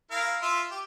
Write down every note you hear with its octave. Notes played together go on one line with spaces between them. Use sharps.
E4 A#4 F5
F4 E5 C6
G4